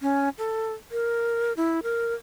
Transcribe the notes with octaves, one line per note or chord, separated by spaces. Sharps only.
C#4
A4
A#4
E4
A#4